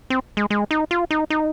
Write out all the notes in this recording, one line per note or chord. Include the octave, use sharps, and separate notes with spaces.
C4
G#3
G#3
D#4
F4
D#4
D#4